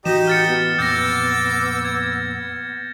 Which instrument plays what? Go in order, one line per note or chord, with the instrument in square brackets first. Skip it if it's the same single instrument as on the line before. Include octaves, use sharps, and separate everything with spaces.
[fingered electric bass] A1 E3 [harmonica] D#4 G4 D#5 [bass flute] F#4 [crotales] E7
[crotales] F6 A6 C#7
[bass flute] B3
[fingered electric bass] F2 A#2 C4 [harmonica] D6 E6 [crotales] G6 A6 A#6
[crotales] G#6